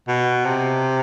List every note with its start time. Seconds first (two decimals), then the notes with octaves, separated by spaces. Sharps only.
0.08 B2
0.45 C3